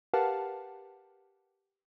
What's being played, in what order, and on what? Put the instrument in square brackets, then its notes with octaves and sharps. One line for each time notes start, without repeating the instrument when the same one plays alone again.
[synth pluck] G4 A#4 B4 F5 F#5 A5